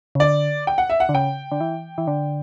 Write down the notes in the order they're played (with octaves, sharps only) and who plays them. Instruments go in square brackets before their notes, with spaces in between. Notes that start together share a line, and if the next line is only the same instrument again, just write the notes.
[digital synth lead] C#3
[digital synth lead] D3 [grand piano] D5
[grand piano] G5
F#5
E5
F#5
[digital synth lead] D3
[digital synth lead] C#3 [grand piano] G5
[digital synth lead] D3
E3
E3
D3